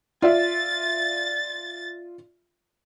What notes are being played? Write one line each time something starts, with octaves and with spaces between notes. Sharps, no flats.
F4 D5 E5 A6